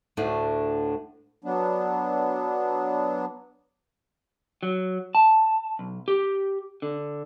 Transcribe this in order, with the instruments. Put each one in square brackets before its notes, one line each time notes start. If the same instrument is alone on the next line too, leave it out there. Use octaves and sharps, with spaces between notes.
[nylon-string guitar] D2 A2 D3
[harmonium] F#3 B3 D4
[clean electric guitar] F#3
A5
B1
G4
D3